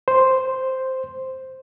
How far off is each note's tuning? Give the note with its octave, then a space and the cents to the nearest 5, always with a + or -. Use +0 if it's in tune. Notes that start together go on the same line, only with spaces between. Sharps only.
C5 +0